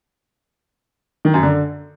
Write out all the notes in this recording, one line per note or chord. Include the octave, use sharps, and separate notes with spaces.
D#3
F#2
D3